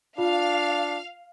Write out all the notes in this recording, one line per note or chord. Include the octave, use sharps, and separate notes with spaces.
D4 F4 F5